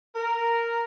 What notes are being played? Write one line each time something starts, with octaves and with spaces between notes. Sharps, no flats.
A#4